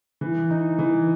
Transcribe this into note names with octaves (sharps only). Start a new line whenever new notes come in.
E3
D#4
E3